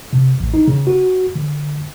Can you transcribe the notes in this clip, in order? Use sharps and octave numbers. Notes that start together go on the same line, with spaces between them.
C3
A1
D#4
C#3
F#4
D3